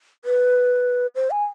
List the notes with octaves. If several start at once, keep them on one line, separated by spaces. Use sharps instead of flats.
B4
C5
G#5